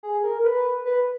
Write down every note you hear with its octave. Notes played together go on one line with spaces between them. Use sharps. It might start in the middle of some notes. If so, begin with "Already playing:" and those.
G#4
A#4
B4
B4